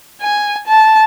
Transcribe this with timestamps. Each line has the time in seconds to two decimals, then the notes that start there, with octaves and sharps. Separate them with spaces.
0.21 G#5
0.67 A5